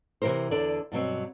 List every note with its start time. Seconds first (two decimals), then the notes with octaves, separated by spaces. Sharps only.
0.22 C3 E3 G4 A#4 C5
0.51 E2 D3 D4 A4 D5
0.92 G2 B2 F#3 C4